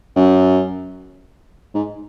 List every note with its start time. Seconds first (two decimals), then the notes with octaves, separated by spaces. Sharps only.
0.16 F#2
1.74 G#2